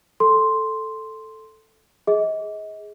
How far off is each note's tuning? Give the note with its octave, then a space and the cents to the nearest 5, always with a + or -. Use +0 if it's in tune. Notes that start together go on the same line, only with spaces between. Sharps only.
A4 +0 C6 +0
G#4 +0 D#5 +30